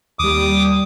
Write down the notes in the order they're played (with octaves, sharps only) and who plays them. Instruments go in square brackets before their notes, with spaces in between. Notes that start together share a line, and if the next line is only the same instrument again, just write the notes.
[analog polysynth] D#2 G3 [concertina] D6 D#6